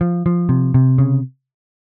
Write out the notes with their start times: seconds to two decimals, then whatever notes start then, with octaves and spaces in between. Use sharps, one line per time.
0.01 F3
0.26 F3
0.49 C3
0.74 C3
0.98 C#3